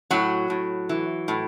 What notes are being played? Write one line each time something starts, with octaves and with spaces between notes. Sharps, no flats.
A2 F#3 F#4
A2
E3
A2